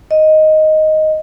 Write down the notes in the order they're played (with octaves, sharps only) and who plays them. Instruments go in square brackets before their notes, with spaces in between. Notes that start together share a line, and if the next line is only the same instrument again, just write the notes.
[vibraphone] D#5